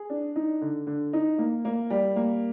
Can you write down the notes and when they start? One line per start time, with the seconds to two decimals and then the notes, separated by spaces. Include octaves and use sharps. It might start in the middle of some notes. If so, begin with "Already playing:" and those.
Already playing: G#4
0.10 D4
0.36 D#4
0.61 D3
0.87 D3
1.13 D#4
1.38 A#3
1.65 A#3
1.90 G3
2.16 A#3